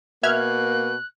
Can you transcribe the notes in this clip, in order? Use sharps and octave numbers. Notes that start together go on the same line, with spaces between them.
B2 A#3 E5 F6 F#6 G#6